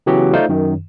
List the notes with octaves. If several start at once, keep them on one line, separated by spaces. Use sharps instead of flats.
C#3 E3 F#3 B3 F#4 G4
A3 D#4 F4 C5 D5 F5
F#2 D#3